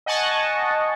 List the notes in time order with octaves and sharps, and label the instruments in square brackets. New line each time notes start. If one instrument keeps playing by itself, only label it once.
[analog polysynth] D#5 F#5 G#5 A5 C#6